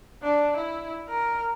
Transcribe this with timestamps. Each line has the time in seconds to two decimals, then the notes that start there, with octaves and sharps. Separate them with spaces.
0.23 D4
0.57 E4
1.08 A#4